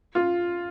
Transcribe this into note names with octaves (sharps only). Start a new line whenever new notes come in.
F4